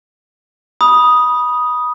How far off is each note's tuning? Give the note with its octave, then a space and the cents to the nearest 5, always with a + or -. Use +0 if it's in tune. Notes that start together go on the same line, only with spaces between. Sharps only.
B5 -20 D#6 +0